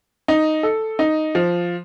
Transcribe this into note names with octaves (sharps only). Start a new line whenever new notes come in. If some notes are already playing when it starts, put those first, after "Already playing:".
D#4
A4
D#4
F3